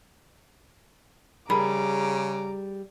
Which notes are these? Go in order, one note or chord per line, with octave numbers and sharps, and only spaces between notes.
C#3 G3 G#4 A#4 A#5 B5 D6